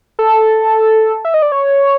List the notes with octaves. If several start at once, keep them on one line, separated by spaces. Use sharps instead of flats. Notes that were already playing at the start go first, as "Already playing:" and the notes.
A4
E5
D#5
D5
C#5